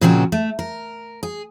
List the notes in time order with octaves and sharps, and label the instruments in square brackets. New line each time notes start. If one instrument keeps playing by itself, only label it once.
[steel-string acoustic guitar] A#2 C#3 F3 C4 F4 F#4
A3
A#4
G#4